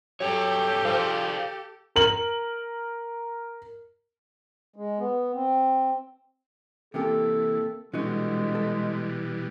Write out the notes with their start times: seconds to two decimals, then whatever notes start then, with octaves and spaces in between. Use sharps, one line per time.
0.20 G2 B2 F#3 G4 A4 C#5
0.85 F3 G#4 D5 F5
1.96 A#4 F#7
4.76 G#3
4.99 B3
5.34 C4
6.94 C3 E3 A#3 G4 A4
7.94 B2 D3 E3 G3 G#3 F#4 D#5
8.55 A4